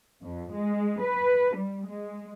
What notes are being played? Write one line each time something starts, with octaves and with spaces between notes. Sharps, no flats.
F2
G#3
B4
G3
G#3